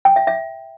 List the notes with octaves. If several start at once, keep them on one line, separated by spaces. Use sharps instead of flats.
G5
E5
E5